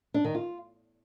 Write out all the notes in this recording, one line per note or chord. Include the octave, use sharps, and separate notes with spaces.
D4
D#3
F4